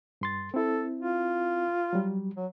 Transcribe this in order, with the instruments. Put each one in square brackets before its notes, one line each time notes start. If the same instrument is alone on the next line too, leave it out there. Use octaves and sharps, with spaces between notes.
[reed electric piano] G2 C6 A6
[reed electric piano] C4 E4 [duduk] A4
[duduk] F4
[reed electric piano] F#3 G3
[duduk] F#3